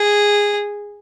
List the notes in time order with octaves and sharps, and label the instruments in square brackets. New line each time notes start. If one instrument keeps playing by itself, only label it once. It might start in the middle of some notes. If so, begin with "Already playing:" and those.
Already playing: [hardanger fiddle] G#4